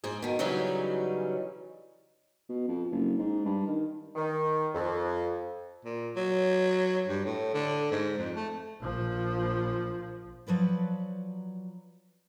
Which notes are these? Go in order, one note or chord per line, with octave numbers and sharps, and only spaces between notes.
G#2 G#4
B2 D#3
C#3 E3 F#3 G3 C#4 D#4
B2
F2
F#1
G#2
G2
D#3
D#3
F2
A#2
F#3
G2
A2
D3
G#2
F2
A3
A#1 F3
F3 F#3 B4 D5